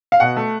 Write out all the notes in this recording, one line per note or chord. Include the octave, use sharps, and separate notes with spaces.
F5
B2 F#5
A3